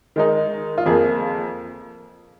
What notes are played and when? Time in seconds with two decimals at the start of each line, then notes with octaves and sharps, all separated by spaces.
0.16 D#3 G#3 D#4
0.78 F4
0.86 F2 F3 A#3 G#4